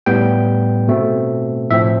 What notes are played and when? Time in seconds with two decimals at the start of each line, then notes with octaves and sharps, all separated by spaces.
0.06 A2 G3 B3 G5
0.88 B2 A3 C4
1.70 A2 F3 C4 E5